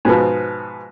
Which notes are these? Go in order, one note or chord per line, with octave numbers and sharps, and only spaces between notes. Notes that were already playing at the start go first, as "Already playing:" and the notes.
G#2 B2 F3 B3